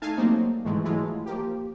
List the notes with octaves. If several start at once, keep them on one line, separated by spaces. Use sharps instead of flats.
A3 D#4 F5 G#5 A5
F#3 G3 A3 A#3 C4 D#4
G#2 D#3 E3 G#3 A3
E3 F#3 G#3 A3 E4 F4
F3 A#3 G4